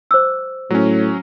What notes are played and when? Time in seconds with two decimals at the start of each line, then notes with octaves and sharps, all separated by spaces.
0.11 C5 D6 E6
0.70 A2 F#3 C#4